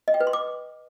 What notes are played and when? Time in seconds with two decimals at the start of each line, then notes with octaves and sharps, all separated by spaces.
0.08 D#5
0.14 G5
0.20 B4
0.27 C6
0.33 D6